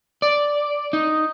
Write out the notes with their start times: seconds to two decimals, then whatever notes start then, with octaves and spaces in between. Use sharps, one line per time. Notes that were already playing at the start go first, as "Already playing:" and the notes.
0.22 D5
0.93 D#4